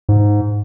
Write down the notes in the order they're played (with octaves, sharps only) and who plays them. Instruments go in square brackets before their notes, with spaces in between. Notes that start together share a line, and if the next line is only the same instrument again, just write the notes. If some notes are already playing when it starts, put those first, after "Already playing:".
[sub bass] G#2